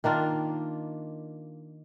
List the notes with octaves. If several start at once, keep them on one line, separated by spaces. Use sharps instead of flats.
D#3 A#3 D4 F4